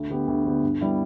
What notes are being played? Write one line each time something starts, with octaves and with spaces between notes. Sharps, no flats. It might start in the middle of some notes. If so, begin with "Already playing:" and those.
Already playing: D2
D3 B3 G4
D2
D3 B3 G4
G2
G3 B3 E4